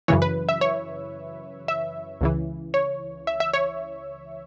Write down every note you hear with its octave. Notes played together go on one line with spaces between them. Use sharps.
F#2 C#3 E3 C#5
B4
E5
C#5
E5
C#2 C#3 E3
C#5
E5
E5
C#5